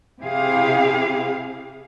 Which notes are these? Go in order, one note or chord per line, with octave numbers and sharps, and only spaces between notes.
C3 E4 G4 G#4 F5